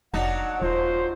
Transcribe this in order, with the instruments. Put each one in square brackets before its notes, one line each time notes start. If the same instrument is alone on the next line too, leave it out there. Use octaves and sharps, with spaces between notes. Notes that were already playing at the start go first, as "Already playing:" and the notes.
[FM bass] F1 [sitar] F#3 D4 D#4 [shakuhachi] F#5
[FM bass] D#1 [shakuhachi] F4 [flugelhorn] C5